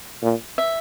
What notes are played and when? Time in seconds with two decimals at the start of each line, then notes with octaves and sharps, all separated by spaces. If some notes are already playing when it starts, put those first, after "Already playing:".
0.23 A#2
0.58 E5